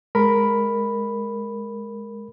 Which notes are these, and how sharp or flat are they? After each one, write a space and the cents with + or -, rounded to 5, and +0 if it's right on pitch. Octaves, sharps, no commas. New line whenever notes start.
G#3 +5 A#4 +0 B5 +0